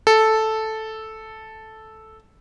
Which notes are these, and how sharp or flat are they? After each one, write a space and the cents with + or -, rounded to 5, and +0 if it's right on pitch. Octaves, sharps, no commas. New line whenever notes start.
A4 -5